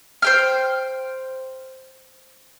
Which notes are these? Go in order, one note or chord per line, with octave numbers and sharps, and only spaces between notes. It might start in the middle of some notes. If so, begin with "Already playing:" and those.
C5 G5 F6